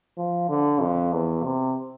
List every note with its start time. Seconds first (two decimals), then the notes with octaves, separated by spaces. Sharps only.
0.18 F3
0.49 D3
0.81 F2
1.13 E2
1.44 C3